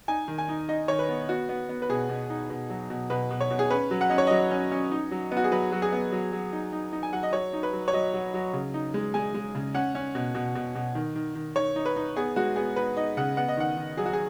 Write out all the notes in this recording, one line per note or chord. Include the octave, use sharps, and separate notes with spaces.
D#4 G#5
D#3
G#5
D#4
D#4 D#5
D#3 C#5
B4
B3
B3 F#4
B3
B3
B4
B2 G#4
B2
D#4
B2
F#3
B2
B2 B4
B2
C#5
B2
G#4
C#4 B4
F#3
F#5
C#4 D#5
C#5
F#3 D#5
C#4
C#4
D#4
F#3
B3
F#4
G#4
F#3 B4
F#3
G#4
B3
F#3
F#3
D#4
D#4
D#4
G#5
F#3 F#5
D#5
F#3 C#5
D#4
B4
F#3
C#5
F#3 D#5
F#3
F#3
C#3
D#4
G#3
G#3 G#5
G#3
C#3
C#4 F#5
C#4
B2
B2
B2
B2
D#3
D#3
D#3
D#3 C#5
D#4
B4
D#4
B3 G#4
G#3 F#4
B3 G#4
B3 B4
D#4 D#5
C#3 F#5
B3 F#5
D#5
D#3 F#5
D#3
F#3 G#4
F#4
G#4